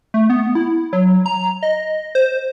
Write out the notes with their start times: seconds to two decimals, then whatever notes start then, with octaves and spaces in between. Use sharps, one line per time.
0.14 A3
0.30 B3
0.55 E4
0.93 F#3
1.26 A#5
1.63 D#5
2.15 C5